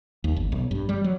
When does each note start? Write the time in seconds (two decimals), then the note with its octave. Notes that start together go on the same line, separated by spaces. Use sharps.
0.24 D#2
0.36 G1
0.52 B1
0.71 G2
0.89 G3
1.04 F#3